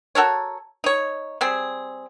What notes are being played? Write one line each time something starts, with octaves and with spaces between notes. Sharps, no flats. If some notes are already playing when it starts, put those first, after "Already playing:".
F#4 A4 A#4 C#5
D#4 C#5
G3 C4 G#4